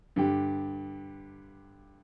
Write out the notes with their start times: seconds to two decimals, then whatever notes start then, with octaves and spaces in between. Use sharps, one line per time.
0.16 G2 D3 G4